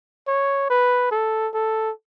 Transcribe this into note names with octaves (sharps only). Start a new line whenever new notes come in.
C#5
B4
A4
A4